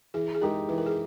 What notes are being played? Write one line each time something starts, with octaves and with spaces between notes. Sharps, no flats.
E3 G#4
G#4
G#3 D#4 G4 A#4
E3 B4
A#4
G#4